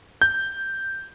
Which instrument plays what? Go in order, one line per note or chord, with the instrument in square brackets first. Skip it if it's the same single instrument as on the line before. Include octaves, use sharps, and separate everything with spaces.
[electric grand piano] G6